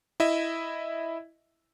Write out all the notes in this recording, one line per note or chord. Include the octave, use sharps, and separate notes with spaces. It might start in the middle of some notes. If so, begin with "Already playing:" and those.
E4 D#5 E5